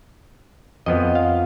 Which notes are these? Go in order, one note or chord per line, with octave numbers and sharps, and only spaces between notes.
F2 F3 B3 D#5
F5